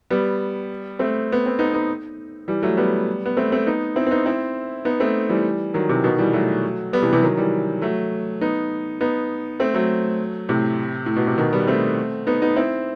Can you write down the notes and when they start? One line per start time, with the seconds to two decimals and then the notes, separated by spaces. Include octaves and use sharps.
0.10 G3 B3
0.99 A3 C4
1.32 B3
1.46 C4
1.59 B3 D#4
1.74 B3 D#4
2.48 E3 G3
2.62 F#3 A3
2.77 G3 B3
3.26 B3
3.37 A3 C4
3.52 A3 C4
3.67 B3 D#4
3.96 C4 E4
4.06 C4
4.11 B3 D#4
4.26 C4 E4
4.85 B3 D#4
5.00 A3 C4
5.29 E3 G3
5.74 D#3 F#3
5.89 C3 E3
6.04 B2 D#3
6.18 E3 G3
6.33 F#3 A3
6.93 G3 B3
7.02 C3 E3
7.13 C3 E3
7.22 D#3 F#3
7.37 E3 G3
7.82 F#3 A3
8.41 B3 D#4
9.01 B3 D#4
9.60 A3 C4
9.74 F#3 A3
10.49 A2 C3
11.06 A2
11.16 B2
11.27 C3
11.38 B2 D#3
11.53 G3 B3
11.67 A3 C4
12.27 B3 D#4
12.42 B3 D#4
12.56 C4 E4